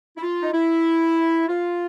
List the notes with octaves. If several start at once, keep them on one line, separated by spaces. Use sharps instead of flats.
E4
F4
D#4
E4
F4